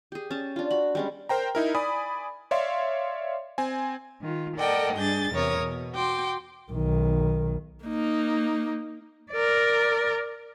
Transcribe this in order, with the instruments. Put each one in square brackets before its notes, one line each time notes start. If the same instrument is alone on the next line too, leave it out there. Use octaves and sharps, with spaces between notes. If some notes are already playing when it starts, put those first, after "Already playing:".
[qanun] G4 G#4
C#4 A5
D4 F4
F#4 B5
G3 G#3 C#4
[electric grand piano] A#4 C5 G5 A#5
D#4 E4 A#4
D5 G#5 B5 D#6
C#5 D5 E5 F5 C6
C4 G#5
[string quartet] D#3 F4
A4 A#4 D5 D#5 F#5 G5
G2 D4 G#4 G6 A6
E2 C3 A#4 C#5 D#6
B2
F#4 G5 C6 D6
[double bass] B1 D#3
[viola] A#3 D#4
[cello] A#4 D5